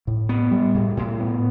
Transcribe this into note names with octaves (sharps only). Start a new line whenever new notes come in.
A2
B3
G3
A2
A2
B3